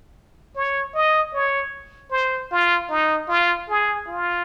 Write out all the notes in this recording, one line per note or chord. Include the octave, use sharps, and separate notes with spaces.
C#5
D#5
C#5
C5
F4
D#4
F4
G#4
F4